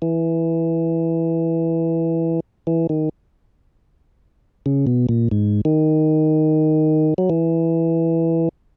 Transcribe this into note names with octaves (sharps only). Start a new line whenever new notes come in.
E3
E3
D#3
C#3
B2
A#2
G#2
D#3
F#3
E3